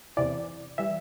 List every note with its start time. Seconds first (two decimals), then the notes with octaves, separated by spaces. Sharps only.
0.17 E2 C3 E3 D5
0.78 E3 G3 E5